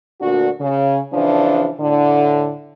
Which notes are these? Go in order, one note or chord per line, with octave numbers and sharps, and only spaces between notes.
D2 A#2 D4 F#4
C#3
C#3 E3 F3 D4
A2 D3